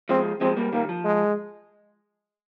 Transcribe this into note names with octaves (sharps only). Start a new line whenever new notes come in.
F3 G#3 C4
F3 G#3 C4
G3 A#3
D#3 G3 A#3
F3
G#3